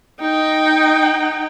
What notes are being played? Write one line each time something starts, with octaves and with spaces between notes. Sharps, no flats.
D#4 G5